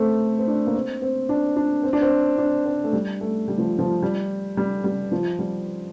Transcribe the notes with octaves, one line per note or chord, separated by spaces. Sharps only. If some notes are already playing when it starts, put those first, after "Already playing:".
Already playing: A3 C4
C4
D4
A#3
C4
C4
D4
D4
C4
D4
C4
D4
C4
A3
G3
A3
G3
F3
F3
G3
G3
G3
F3
G3